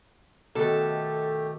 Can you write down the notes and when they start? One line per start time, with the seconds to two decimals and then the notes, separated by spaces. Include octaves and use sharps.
0.55 B2 D#3 A3 G4 A4